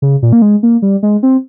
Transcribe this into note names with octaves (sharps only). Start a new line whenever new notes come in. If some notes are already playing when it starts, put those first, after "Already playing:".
C#3
A#2
A#3
G#3
A#3
G3
G#3
C4